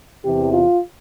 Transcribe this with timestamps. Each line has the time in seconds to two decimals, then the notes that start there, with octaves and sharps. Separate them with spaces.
0.25 E2 C3 E3 G4
0.53 F4